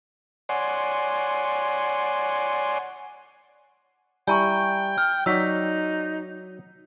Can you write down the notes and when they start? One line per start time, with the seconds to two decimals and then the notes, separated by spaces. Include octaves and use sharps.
0.49 C#5 D5 F#5 G#5 C6
4.27 G3 E4 G5 G#5 A#5 C#6
4.98 F6
5.26 F#3 D#4 F#4 D5 E6 B6